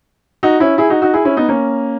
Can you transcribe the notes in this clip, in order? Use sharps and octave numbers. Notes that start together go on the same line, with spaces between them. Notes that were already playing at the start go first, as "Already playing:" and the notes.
D#4 F#4
C#4 E4
E4 G#4
D#4 F#4
D#4 F#4
E4 G#4
C#4 E4
B3 D#4
A#3 C#4